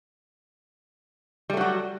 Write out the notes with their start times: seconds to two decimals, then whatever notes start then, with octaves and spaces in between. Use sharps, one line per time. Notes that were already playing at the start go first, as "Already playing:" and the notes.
1.50 G3
1.53 A3
1.57 F#3
1.61 F#4